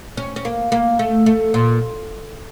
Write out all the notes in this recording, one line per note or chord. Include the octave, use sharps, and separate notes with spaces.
C#4
C#4
A#3
A#3
A3
A3
A#2